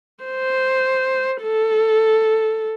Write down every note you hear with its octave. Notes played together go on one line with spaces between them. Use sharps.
C5
A4